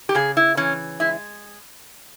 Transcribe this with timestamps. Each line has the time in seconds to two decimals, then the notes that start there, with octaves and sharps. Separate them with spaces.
0.09 G4
0.15 C#3 G#4
0.37 E4
0.57 E3 C#4
1.00 G#3 E4